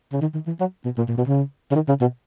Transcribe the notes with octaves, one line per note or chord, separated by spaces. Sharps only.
C#3
D#3
D#3
E3
F#3
B2
A#2
A#2
B2
C#3
C#3
D#3
C#3
B2